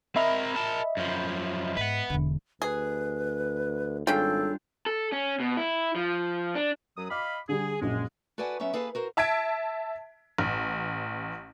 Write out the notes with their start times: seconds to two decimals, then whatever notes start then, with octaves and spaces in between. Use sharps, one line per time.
0.16 C4 A#4 D#5 E5 B5
0.56 A#4 A5
0.97 F#2 F3
1.77 G#2 B4 F#5
2.10 E1 D3
2.62 D2 G#4 B4
4.07 G#1 C#3 G3 D4 F4 A4 G5
4.86 A4
5.12 C#4
5.40 B2
5.57 E4
5.96 F3
6.55 D4
6.97 F#2 F#3 D#6
7.11 D#5 F5 B5 D6
7.49 D3 G3 G#4
7.81 A#1 F#2 G#3
8.38 F#4 A4 B4 D5 F#5 G#5
8.60 F#3 B3 C#4 E5
8.73 A#3 G#4 A4 B4 E5 F5
8.95 F#4 A#4 C5
9.17 E5 A5 G#6 B6 D7
10.38 A1